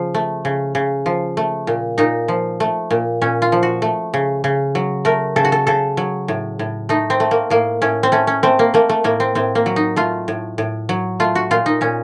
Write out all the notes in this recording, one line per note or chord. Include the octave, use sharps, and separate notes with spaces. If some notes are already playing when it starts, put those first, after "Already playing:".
Already playing: C#3 F3
A3
C#3
C#3
F3
A3
A#2
A#2 D#4
F3
A3
A#2
A#2 C#4
F4
F3
F#4
A3
C#3
C#3
F#3
A3 A#4
C#3 A4
F#4
A4
C#3 A4
F#3
A2
A2
A3 D#4
C4
A3
A#3
A2 A#3
A2 C#4
C4
A3 C#4
C#4
A3 C4
A#3
A3 A#3
A3
A2 A#3
C4
A2 C4
A#3
F#3
D#4
A3 F4
A2
A2
F#3
A3 F4
F#4
A#2 F4
D#4
A#2 C#4